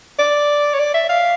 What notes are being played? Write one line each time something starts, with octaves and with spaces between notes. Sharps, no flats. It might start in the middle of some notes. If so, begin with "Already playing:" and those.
D5
C#5
D5
E5
F5